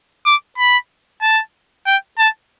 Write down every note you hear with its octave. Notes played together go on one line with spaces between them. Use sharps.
D6
B5
A5
G5
A5